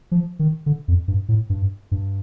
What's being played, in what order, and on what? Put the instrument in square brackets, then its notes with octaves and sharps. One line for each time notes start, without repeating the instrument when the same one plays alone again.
[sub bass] F3
D#3
D3
F2
G2
A2
G2
G2